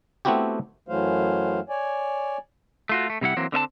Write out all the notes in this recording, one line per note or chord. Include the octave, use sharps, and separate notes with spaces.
A3 B3 C4 E4 F#4 G4
F#2 E3 F#3 A3 C5 F5
C#5 D5 G#5
A3 F4 F#4
A3
C3 G3 E4 F#5
E3 F#3 A#3 C4
D3 C4 E5 A5